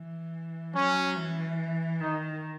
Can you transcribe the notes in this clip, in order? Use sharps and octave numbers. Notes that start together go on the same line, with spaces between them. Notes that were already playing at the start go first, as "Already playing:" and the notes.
Already playing: E3
F#3 C#4
E3
D#3 D#4